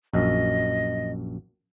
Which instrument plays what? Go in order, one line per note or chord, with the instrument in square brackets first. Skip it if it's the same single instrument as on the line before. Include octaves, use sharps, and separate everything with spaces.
[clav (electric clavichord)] A#1 F#2 [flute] D#5